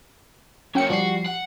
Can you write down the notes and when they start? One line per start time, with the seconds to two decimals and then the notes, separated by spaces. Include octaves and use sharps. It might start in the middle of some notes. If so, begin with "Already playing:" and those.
0.75 F#3 A#3 C#4 G5 C#7
0.90 F3 G3 F#4 C7
1.26 F#5